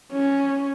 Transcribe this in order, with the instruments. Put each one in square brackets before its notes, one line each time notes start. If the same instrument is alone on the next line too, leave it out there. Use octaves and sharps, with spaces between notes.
[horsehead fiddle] C#4